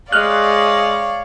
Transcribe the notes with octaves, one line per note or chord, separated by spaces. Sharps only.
G#3 C#5 D5 F5 F6 F#6